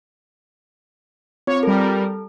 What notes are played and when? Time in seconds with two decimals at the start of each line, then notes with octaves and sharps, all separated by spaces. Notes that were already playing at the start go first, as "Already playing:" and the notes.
1.47 C4 F4 C#5
1.63 G3 A4 A#4